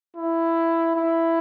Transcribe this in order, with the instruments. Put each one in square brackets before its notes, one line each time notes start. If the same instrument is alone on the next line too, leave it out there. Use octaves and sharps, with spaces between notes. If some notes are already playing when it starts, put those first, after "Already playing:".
[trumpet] E4
E4